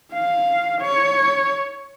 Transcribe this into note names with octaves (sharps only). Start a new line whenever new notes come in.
F5
C#5